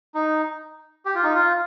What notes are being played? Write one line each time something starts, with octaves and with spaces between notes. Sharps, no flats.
D#4
G4
F4
D#4
F4